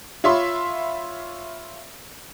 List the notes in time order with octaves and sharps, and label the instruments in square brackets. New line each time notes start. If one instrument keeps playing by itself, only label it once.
[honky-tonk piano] F4 C#5 E5 B5 C6